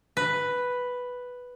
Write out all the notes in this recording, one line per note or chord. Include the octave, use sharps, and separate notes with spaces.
B4